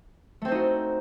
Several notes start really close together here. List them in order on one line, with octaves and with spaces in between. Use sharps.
A3 C4 C5 D#4 F#4